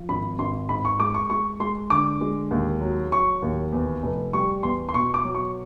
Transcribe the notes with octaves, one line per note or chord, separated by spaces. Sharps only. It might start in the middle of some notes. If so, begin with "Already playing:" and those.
Already playing: F3
G#1 B5
G#1 C6
G#2 B5
C#6
G#3 D6
C#6
G#3 C#6
G#3 C6
D3 D6
G#3
D#2
F#3
F#3 C#6
D#2
E2
F1
G3 C#6
E2 C6
C6
B2 C#6
D6
F#3
C#6